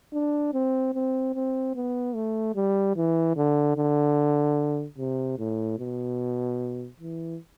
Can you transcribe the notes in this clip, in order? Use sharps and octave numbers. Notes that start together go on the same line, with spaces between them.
D4
C4
C4
C4
B3
A3
G3
E3
D3
D3
C3
A2
B2
E3